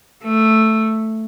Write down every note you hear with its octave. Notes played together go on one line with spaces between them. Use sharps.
A3